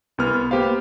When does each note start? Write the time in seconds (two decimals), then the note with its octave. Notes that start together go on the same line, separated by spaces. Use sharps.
0.18 C2 B3 F6
0.51 A#3 B3 G4 C5 F5